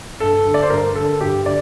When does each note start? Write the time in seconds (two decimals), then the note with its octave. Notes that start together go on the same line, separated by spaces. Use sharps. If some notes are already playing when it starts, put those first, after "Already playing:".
0.20 G2 A4
0.46 D3
0.54 D5
0.63 C5
0.70 G2 A#4
0.95 D3 A4
1.21 G2 G4
1.46 D3 D5